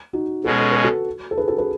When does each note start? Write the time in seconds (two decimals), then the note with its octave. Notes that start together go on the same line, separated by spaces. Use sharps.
0.13 D#4 F#4
0.44 B2 G#3 C#4 F#4 A4
0.60 A4
0.71 B4
0.83 F#4 A4
1.31 A4
1.37 G#4 B4
1.48 F#4 A4
1.58 G#4 B4